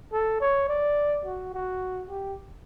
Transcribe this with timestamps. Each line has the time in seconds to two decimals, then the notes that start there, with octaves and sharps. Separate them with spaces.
0.12 A4
0.41 C#5
0.69 D5
1.25 F#4
1.53 F#4
2.10 G4